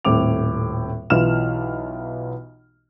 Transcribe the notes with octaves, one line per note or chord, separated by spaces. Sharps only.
D#1 A2 C4 D6 F7
B1 E3 F4 F6 E7